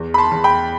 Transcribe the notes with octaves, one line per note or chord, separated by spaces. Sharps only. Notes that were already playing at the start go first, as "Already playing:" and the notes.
Already playing: E2
B5
A5 C6
E2
G5 B5